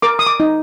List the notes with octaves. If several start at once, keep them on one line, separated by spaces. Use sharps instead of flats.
A#4 D6
D#6
D6
D#4